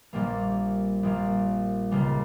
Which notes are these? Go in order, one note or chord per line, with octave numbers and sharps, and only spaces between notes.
A#1 A#2 G3 A#3
A#1 A#2 G3 A#3
C#2 C#3 G3 A#3